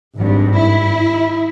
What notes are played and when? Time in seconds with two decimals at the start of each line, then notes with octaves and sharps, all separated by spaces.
0.17 G#1 G2
0.58 E4